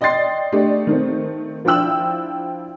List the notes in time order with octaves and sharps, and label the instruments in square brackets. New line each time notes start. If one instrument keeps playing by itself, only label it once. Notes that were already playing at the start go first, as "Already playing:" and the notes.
[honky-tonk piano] D5 D#5 G5 C6 A6 C7
A3 D4 G4 D5 D#5
D#3 A3 C4
F3 D4 E4 G5 E6 F#7